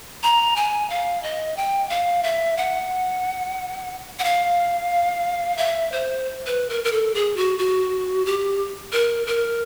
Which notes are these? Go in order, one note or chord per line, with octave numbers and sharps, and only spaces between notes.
A#5
G#5
F5
D#5
G5
F5
E5
F#5
F#5
F5
E5
C5
B4
A#4
A#4
A4
G#4
F#4
F#4
G4
A#4
A#4